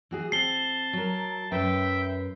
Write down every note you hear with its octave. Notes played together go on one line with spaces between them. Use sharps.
E3 F#4 G#4
C4 A5 C7 G7
F#3 A#4
F#2 B4 E5 G5